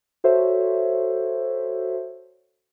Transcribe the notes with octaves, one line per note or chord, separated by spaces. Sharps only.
F#4 A4 C5 C#5 E5